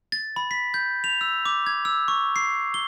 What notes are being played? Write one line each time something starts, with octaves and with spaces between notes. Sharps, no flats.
A6
B5
B6
G6
F7
E6
D6
G#6
E6
C#6
C7
G7